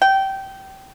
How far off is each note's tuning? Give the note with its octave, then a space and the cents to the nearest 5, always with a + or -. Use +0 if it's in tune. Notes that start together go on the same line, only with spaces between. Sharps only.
G5 -20